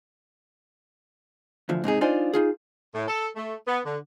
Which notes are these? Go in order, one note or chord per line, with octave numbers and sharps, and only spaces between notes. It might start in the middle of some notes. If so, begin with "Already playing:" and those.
D2 E3 F3
G#2 C3 D#4 G#4
D4 D#4 F4 C5 D5 G#5
D#4 F4 G#4
A2
A4
A3
B3
D3